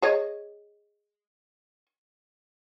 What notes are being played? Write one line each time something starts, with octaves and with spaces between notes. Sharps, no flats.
G#4 C#5 D#5